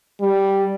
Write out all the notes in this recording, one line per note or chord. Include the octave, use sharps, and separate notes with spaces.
G3